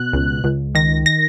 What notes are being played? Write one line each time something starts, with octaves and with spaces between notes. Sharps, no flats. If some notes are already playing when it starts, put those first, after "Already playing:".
Already playing: B2 F#6
C#2
C#2
D#3 A#6
A#6